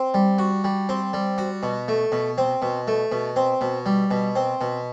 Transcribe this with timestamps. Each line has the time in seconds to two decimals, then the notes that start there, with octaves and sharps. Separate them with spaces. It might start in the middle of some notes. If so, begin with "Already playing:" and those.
Already playing: C4
0.14 G3
0.38 F#4
0.64 G3
0.89 C4
1.13 G3
1.38 F#4
1.63 B2
1.88 A3
2.12 B2
2.38 C4
2.62 B2
2.87 A3
3.12 B2
3.36 C4
3.61 B2
3.86 G3
4.11 B2
4.36 C4
4.61 B2